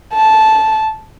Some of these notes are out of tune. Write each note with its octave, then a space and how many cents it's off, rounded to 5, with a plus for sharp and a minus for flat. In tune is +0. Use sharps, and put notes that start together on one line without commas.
A5 -10